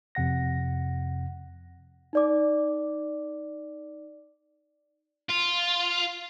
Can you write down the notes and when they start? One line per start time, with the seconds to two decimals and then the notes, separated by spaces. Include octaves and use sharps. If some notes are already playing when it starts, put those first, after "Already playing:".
0.15 F2 C3 F#5 A#6
2.13 D#4 D5 D6
5.30 F4